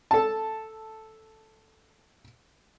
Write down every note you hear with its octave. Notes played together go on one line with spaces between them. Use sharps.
A4 A5